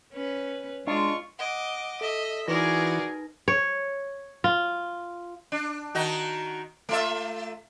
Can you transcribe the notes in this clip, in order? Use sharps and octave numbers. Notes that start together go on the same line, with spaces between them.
C#4 B4
G#3 D4 F4 C#6
D#5 F#5 D6
A4 D#5 E5
E3 D#4 F#4 G#4 A#4 B4 D5 A#6
C#5
F4
D4
D#3 D#4 F#4
A3 F4 E5